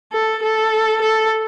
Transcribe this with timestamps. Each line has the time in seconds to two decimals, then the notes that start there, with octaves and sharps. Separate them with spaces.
0.12 A4
0.43 A4
1.01 A4